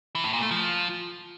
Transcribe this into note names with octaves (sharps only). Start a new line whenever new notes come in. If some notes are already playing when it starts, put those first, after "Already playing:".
E3
A2
A#2
A3
F3